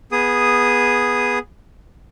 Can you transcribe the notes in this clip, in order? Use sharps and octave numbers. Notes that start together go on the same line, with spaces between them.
B3 G#4 D#6